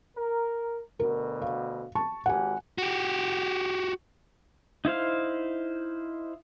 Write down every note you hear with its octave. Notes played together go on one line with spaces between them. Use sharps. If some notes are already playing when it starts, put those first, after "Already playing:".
A#4
D2 B2 D3 A#4
F5
A5 C#6
G#1 G4 F#5 G#5
F#4 G4
D#4 E4 C5 F5